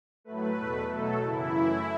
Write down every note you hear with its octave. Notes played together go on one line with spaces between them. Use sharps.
A2 F#3 A3 B4
E2 B2 A3
B2 F#3 A3 A4
F#2 C#3 E3 E4
F#2 E3 A3